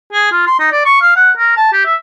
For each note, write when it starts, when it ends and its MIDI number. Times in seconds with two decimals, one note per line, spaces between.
0.12 0.27 68
0.31 0.44 65
0.47 0.57 84
0.59 0.69 63
0.71 0.81 74
0.85 0.97 85
1.01 1.13 77
1.16 1.30 78
1.37 1.53 70
1.56 1.72 81
1.72 1.80 67
1.85 1.94 76